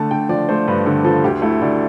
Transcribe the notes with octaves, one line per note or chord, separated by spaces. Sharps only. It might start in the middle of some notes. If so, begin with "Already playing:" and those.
Already playing: D3 A3 A5
D3 G5
F3 D5
A3 C5
G2 B4
D3 A4
F3 A4
D2 G4
A3 E4
D2 D5